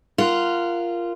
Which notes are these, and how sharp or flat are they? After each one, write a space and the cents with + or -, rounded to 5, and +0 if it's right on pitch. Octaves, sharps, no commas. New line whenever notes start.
F4 -15 A#4 +0 F#5 +0